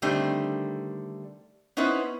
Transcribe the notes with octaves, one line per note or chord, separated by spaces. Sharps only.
D3 D#3 G3 A3 C4 D4
B3 C#4 D#4 E4 B4 C5